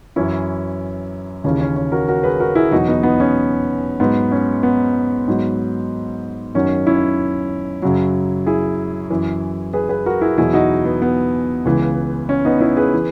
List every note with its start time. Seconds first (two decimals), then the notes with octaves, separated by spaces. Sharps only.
0.16 F#2 E3 C#4 E4
1.44 D#2 C#3 E3 C#4
1.60 C#4
1.76 C#4
1.92 F#4 A#4
2.08 F#4 A#4
2.24 G#4 B4
2.40 F#4 A#4
2.55 E4 G#4
2.72 E2 B2 F#3 D#4 F#4
2.88 B3 D#4
3.03 B3 D#4
3.20 C#4
4.00 G#2 F#3 B3
4.31 C#4
4.63 B3
5.28 G#2 F#3
6.55 F#2 D#3 F#3 C#4
6.87 C#4 E4
7.82 F#2 C#3 F#3
8.46 E4 G#4
9.10 F#2 E3
9.73 G#4 B4
9.89 G#4 B4
10.06 F#4 A#4
10.21 E4 G#4
10.38 E2 B2 F#3 E4 G#4
10.53 D#4 F#4
10.85 B3
11.02 B3
11.65 C#2 C#3 E3
12.29 C#4
12.45 B3 D#4
12.61 C#4 E4
12.76 G#4 B4
12.94 E3